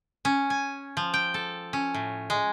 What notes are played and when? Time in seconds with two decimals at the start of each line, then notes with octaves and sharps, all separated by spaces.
0.25 C#4
0.50 G#5
0.97 F3
1.14 G5
1.34 A4
1.73 C#4
1.94 A2
2.30 G#3